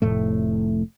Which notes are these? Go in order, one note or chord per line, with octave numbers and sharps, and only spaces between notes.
F1 A2 A3